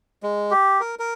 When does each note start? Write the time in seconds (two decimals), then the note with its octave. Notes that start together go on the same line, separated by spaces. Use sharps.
0.23 G#3
0.51 G4
0.80 A#4
0.99 A#4